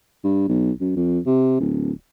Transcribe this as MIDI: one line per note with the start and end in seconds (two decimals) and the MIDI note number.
0.24 0.44 43
0.48 0.71 35
0.80 0.96 42
0.97 1.19 41
1.26 1.58 48
1.60 1.92 26